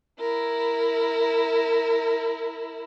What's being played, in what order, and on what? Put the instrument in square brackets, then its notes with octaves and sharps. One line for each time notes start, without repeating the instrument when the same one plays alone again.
[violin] E4 A#4